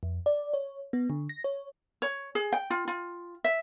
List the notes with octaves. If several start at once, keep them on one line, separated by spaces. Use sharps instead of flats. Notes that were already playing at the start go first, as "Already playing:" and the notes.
F2
D5
C#5
B3
D3
A#6
C#5
C#5
G#4
G5
F4
F4
E5